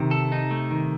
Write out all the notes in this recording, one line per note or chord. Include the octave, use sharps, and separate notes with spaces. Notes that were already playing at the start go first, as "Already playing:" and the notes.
Already playing: C3 D#3
A4
D#4
A3
D#3